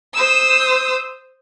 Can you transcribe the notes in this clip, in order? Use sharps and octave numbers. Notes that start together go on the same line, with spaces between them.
C5 D#6 E6